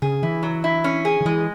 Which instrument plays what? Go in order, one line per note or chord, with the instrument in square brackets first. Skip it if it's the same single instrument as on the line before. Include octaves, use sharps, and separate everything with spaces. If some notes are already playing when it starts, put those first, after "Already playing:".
[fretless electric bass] C#3 [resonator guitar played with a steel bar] G#4
[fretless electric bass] E3 [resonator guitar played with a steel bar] E4
[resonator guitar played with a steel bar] F#3
E4
C#4
G#4
[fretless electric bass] D#3
[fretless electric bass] E3 [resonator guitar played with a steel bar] G#3